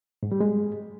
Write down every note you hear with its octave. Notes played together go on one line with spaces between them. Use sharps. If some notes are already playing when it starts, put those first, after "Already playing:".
G#2
G3
G#3